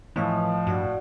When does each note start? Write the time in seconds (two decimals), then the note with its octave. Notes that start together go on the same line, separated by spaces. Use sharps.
0.16 A2 E3 F3 D#5 F5 D#6
0.67 G2 F#4 D5 F#5